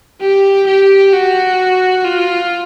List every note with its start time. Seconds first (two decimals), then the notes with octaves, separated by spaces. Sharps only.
0.21 G4
0.67 G4
1.13 F#4
2.04 F4